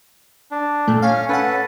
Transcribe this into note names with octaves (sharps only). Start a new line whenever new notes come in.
D4
A#2 A3
C#4 F5
C#4 A4 B4 F#5